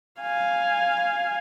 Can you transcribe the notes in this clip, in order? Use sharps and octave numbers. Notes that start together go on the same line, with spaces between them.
F5 G#5